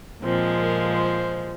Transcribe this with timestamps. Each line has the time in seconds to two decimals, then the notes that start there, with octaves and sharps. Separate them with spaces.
0.22 A#2 F3 G#3 C4
0.60 A#4
0.95 C5